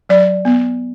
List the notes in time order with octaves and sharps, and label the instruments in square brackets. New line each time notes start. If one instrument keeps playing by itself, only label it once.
[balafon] F#3 D5
B3